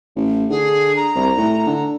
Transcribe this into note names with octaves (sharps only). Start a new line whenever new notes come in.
A1
D3 G#4
A#5
C2
A2
D3